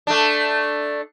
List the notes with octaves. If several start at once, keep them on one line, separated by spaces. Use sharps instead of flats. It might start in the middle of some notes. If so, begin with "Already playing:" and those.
A3 D4